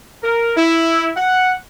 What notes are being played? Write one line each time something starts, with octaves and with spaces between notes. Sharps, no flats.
A#4
E4
F#5